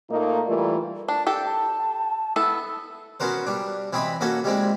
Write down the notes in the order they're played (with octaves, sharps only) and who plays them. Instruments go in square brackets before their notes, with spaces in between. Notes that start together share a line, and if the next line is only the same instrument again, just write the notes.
[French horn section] A#2 A3 A#3 D#4
E3 G3 A3 F4 A#4 D5
[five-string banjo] D4 [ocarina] A5
[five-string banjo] G4 A4 [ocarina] G5
[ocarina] A5
[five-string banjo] B3 E4 A4 [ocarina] E6
[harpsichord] B3 C#4 F#4 A#4 C5
G3 D4
E3 C4 E4 D#5 B5
A#3 C#4 F#4 A4 C#5
G3 G#3 C4 E4